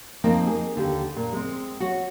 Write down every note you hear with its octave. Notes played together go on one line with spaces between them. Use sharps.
F3 A#3 C4 D#4
G#4
D#2 D3 G4
A#2
G#3 C4
F#4 C#5